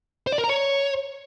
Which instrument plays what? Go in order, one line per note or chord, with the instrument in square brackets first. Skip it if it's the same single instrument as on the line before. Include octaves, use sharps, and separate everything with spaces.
[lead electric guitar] C5
D5
A#4
A#5
C#5